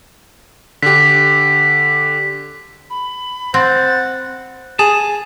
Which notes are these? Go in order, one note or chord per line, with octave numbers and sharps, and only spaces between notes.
D3 G4 B6
B5
C4 C5 F#5 A6
G#4 A5